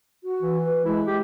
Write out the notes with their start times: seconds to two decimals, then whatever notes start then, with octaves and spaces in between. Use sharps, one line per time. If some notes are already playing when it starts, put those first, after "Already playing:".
0.24 F#4
0.42 E3
0.65 B4
0.85 G#3 E4
1.07 G4